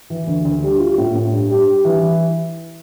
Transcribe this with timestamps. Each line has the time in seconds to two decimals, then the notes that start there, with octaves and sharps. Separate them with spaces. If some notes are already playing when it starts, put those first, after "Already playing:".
0.10 E3
0.27 D2
0.45 D2
0.63 G3
0.80 F4
0.98 A2
1.16 A2
1.32 G2
1.50 G3
1.67 G3
1.85 E3